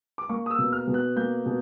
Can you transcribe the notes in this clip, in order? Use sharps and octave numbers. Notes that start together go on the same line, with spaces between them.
D6
A#3 C#6
D#6
E6
B2
F6
B2
F#6
A#3 G6
B2